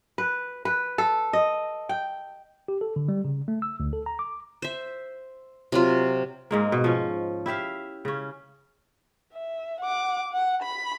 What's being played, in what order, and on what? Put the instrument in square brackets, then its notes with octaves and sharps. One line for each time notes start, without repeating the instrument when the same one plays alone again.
[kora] B4
B4
A4
D#5
G5
[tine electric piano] G4
A4
D3
G3
C#3
A3
E6
D2
A4
A#5
D6
[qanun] C5 E5
C3 F#3 F4
[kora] G#2 G#3 A#3
B2
F3 C#4
E4 G4 E5 F5
C#3 C#4
[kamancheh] E5
F#5 D6
F#5
B5